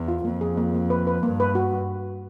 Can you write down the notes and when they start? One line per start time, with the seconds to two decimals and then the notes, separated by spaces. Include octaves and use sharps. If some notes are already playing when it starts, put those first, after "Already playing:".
Already playing: E2
0.08 F4
0.25 F2 A#3
0.41 G#4
0.58 A#3
0.74 A#3
0.90 B4
1.07 B4
1.23 G2 A#3
1.40 B4
1.55 F#4